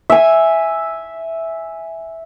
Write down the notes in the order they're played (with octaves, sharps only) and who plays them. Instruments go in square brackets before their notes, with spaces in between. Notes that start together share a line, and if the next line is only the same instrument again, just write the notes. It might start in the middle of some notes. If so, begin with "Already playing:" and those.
[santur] E5 G#5